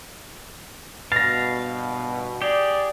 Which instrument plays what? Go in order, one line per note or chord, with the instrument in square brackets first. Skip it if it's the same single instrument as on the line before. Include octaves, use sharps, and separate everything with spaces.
[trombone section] G2 B2 [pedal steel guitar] F5 [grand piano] A6 A#6
[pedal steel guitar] G4 G#4 [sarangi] D5